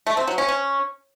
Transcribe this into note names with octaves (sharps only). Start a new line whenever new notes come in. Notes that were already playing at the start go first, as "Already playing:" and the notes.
A3
C4
F#3
C#4
C#4